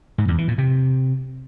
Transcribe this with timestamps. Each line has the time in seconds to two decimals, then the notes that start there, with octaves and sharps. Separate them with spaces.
0.18 G#2
0.28 E2
0.38 E3
0.48 A#2
0.58 C3